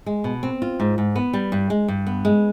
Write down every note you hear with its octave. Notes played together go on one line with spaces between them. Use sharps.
G#3
B2
C4
F4
G#2
G#2
B3
G3
G2
G#3
G2
B3
G#3